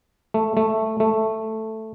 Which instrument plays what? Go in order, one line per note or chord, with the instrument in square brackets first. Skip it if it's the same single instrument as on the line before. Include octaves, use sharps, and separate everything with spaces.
[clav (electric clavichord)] A3
A3
A3